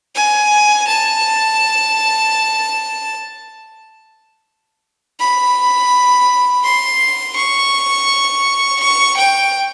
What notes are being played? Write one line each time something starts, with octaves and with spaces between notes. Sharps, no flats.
G#5
A5
B5
C6
C#6
C#6
G5